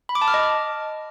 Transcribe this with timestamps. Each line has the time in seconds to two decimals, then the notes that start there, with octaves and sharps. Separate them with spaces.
0.09 B5
0.15 D6
0.22 A5
0.28 F6
0.34 D#5